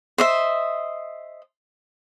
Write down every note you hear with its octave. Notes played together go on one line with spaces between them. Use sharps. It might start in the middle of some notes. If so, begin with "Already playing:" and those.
C5 D#5 E5